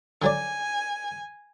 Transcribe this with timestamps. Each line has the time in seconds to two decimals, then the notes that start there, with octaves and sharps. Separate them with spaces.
0.22 D3 F#3 D5 G#5